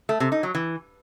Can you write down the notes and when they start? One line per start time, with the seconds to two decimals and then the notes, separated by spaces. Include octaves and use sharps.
0.09 A3
0.20 C3
0.32 D#4
0.43 F#3
0.55 E3